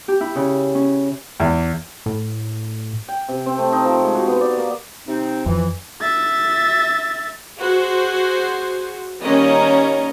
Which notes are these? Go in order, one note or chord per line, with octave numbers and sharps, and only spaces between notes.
G4
E4
C#3
C#4
E2
A2
G5
C3
C4
A3
D#4
F3
G#3
F#4
B3
D5
A#3
C3 C4 D#4
F2 E3
E5 A6
F#4 G#4 C5
D#3 G3 A#3 C#4 D#5 A#5